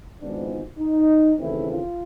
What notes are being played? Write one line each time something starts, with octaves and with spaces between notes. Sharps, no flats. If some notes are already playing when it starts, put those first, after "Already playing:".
G#1 G#2 F3 G#3 B3 D4
D#4
D#2 C#3 E3 A3 C4 E4
F4